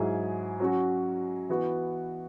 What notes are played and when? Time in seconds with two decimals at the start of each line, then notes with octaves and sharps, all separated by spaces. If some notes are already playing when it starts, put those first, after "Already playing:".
Already playing: G#2 F#3 E4 G#4
0.60 F#3 C#4 F#4
1.49 E3 B3 F#4